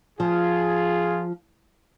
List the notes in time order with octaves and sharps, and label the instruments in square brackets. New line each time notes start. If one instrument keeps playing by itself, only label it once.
[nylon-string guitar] F3 [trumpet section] F4 G#4